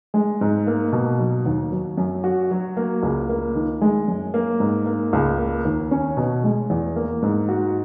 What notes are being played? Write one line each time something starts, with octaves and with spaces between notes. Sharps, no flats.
G#3
G#2
A#3
B2
F#3
D#2
F#3
F#2
F#4
F#3
A#3
C#2
A#3
D#3
G#3
F#2
A#3
G#2
A#3
C#2
A#3
D#2
C#4
B2
G#3
E2
A#3
G#2
F#4